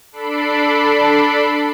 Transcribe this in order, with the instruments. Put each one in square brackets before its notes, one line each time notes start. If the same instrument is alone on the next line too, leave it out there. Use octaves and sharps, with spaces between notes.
[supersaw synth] D4 A4 B5 C7 D7